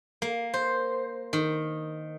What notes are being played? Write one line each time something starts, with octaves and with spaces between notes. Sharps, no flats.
A#3
C5
D#3